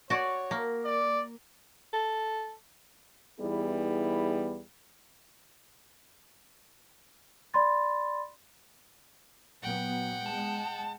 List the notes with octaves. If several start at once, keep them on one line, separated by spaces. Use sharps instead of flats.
F#4 C#5 D5
A#3
D5
A4
E2 G3 B3 D#4 E4 G#4
D5 B5 C6 A6
A#2 F#3 B3 F#5 G5
G#3 A5